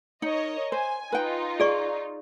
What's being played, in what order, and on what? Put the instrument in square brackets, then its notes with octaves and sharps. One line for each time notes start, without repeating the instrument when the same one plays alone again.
[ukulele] D#4 [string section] A#4 C#5 D#5
[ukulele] C5 [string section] G#5
[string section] D#4 F4 [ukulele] B4 G5
[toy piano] G#4 D5 C#6